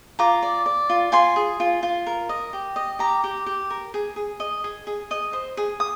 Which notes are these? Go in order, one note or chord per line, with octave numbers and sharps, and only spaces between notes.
F4 A#5 D6
D5
D5
F4
F4 G#5 C6
G#4
F4
F4
A#4
D#5
G4
D#5
G4 A#5 D6
G4
G4
A#4
G#4
G#4
D#5
G#4
G#4
D#5
C5
G#4
D#6